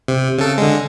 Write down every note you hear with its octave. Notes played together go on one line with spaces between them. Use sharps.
C3
C#3 A4
D3 G#3